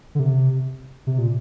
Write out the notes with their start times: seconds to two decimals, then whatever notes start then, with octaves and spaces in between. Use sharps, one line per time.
0.15 D3
0.19 C3
1.07 C3
1.18 A#2